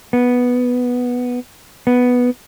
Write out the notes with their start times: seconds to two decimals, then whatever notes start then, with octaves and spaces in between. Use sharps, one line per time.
0.13 B3
1.87 B3